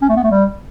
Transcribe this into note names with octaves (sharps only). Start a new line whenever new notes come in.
C#4
A3
B3
A3
G3